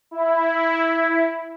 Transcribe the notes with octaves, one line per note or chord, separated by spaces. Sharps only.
E4